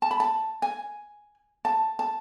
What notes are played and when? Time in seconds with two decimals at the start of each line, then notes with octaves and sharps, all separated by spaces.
0.02 A5
0.11 B5
0.20 A5
0.62 G#5
1.65 A5
1.99 A5